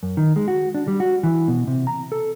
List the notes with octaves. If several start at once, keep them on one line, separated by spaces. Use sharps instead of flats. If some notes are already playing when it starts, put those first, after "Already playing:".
F#2
D#3
G#3
F#4
D4
G3
F#4
E3
B2
C3
A#5
A4